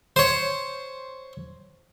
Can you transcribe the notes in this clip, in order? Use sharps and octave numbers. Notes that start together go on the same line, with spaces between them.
C5 C#5